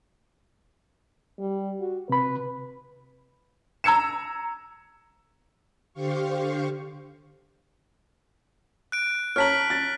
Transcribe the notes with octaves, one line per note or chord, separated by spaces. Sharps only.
G3
F#4
C3 B4 B5
A#5 E6 G#6 C#7 E7
D3 G4 C5 F5 C#6
F#6 D7
C#5 A5 A#5 F6 B6 F#7
A6